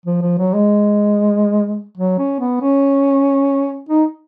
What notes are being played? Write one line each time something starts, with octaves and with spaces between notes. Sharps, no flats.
F3
F3
F#3
G#3
F#3
C#4
B3
C#4
D#4